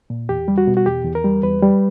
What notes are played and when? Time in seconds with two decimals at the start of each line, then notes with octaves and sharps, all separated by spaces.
0.10 A#2
0.29 E2 G4
0.48 G3
0.58 F#4
0.67 B2
0.77 F#4
0.86 E2 G4
1.05 E2
1.15 A#4
1.24 G3
1.43 E2 B4
1.62 G3